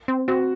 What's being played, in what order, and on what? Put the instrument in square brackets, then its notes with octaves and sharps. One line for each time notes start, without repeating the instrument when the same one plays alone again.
[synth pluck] C4
[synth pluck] C4 [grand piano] F#4